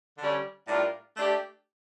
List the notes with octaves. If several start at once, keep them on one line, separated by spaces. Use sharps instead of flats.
D3 G3 C#4
A2 G3 D4 F4 A#4
A3 D4 G4 D5